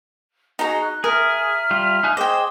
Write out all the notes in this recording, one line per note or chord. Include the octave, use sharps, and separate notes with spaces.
D#4 F#4 G#4 D#5 A#5
F#6
G#4 A#4 E5 F6
G3 F4
D#4 G#5 F#6
G#4 C5 D#5 G5 C6 D6